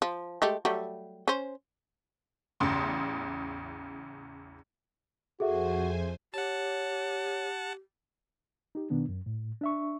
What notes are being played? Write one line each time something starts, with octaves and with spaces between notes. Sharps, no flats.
F3
G#3 A3 G4
F#3 G3 A3
C#4 C5
A1 E2 C#3 C6
F2 F#4 G#4 A4 C5 E5 G#5
G4 C#5 F#5 A5
D#4 G4
B2 D#3 B3 D4
F#2
A2
D4 E5 C#6